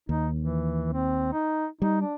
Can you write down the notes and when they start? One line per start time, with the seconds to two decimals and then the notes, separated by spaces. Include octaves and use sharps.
0.09 D#2 D#4
0.37 E3
0.94 C4
1.33 D#4
1.82 G3 D#4
2.01 D4